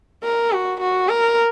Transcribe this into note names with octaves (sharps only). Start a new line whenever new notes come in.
A#4
F#4
F#4
A#4